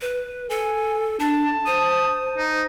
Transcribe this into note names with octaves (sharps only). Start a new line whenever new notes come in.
B4
A4 G#5
D4 A5
C5 D#6
D#4